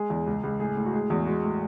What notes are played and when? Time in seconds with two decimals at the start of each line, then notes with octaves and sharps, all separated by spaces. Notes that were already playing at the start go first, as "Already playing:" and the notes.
Already playing: G#3 G#4
0.10 E2
0.27 C#2
0.44 C#2
0.60 A2 G#4
0.77 A2
0.86 F#4
0.93 G#3 G#4
1.10 E2 F#4
1.27 G#3 F#4
1.43 A2